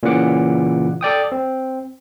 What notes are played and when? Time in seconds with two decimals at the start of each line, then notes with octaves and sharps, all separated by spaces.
0.03 A#2 C#3 E3 F#5 D6
1.01 A4 D5 G5 D#6
1.32 C4